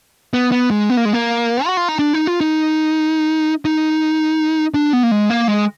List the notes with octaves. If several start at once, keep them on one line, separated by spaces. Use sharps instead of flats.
B3
B3
G#3
B3
A#3
G#3
A#3
F#4
F4
D#4
D4
D#4
F4
D#4
D#4
D4
B3
A#3
G#3
A#3
G#3